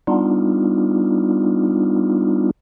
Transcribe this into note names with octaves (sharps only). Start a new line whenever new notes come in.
G3 B3 D4 D#4 F4